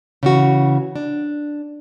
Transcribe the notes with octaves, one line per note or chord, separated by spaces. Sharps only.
C#3 E3 F#4
D4